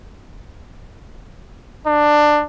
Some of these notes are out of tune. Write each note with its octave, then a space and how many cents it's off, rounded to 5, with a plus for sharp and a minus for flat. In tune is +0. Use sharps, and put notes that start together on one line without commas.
D4 +15